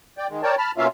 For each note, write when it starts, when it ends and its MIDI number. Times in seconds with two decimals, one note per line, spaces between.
0.18 0.27 74
0.18 0.27 79
0.30 0.42 51
0.30 0.42 56
0.43 0.55 70
0.43 0.55 73
0.43 0.55 74
0.43 0.55 79
0.43 0.55 81
0.58 0.71 81
0.58 0.71 83
0.58 0.71 89
0.77 0.87 47
0.77 0.87 58
0.77 0.87 61
0.77 0.87 65
0.77 0.87 76
0.77 0.87 77